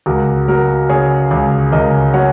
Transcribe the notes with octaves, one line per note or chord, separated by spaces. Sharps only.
C#2 F#4 A#4
F#3 F#4 A#4
C#3 G#4 C#5
C#2
C#2 A#4 D#5
F#3 C#5 F#5